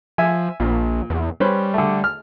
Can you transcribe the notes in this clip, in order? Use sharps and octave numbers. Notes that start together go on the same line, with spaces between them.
F3 E5 G#5
A#1 A#2
E2
G3 C#4 B4 C5
D3 A3
F6